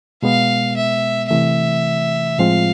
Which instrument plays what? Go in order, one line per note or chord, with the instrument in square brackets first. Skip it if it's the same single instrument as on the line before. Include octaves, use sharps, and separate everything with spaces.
[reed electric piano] B2 G#3 B3 [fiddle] F5
[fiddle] E5
[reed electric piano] C3 E3 A3 [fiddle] E5
[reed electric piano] A2 F3 G#3 C4 F4 [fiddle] F5